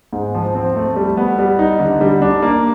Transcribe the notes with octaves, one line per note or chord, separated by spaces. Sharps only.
G#2
F3
C4
A3
G3
B3
G3
D#4
D3
G3
D4
A#3